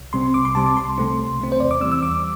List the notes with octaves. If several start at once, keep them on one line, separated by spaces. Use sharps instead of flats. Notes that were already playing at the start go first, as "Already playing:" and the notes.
Already playing: C2
C3 G3 C4 C6
C2 D6
C6
C3 G3 C4 A5
D6
C2 C6
C3 A3 C4
C2
C3 A3 C4
C5
E2 D5
D6
E3 G3 C4 E6
E6
E2 D6